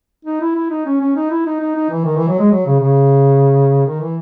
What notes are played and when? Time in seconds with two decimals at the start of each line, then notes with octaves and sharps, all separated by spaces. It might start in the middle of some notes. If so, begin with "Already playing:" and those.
0.25 D#4
0.41 E4
0.55 E4
0.70 D#4
0.86 C#4
1.01 C#4
1.16 D#4
1.30 E4
1.46 D#4
1.60 D#4
1.76 D#4
1.90 E3
2.05 D#3
2.16 E3
2.28 F#3
2.39 G#3
2.51 F#3
2.66 C#3
2.80 C#3
3.86 D#3
4.00 E3